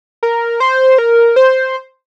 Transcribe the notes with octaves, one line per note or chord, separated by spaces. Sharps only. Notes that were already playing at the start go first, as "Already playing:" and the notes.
A#4
C5
A#4
C5